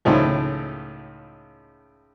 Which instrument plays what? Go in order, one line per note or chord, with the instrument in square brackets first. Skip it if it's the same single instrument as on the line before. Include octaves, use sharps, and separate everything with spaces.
[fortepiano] C#2 A2 D#3 F3